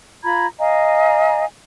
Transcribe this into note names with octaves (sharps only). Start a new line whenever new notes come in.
F4 A#5 B5 G#6
D#5 F5 G#5 A#5